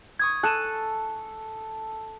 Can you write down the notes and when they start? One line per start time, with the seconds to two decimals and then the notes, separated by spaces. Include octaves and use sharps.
0.19 C#6 D#6 G#6
0.43 A4 F#6 D#7 E7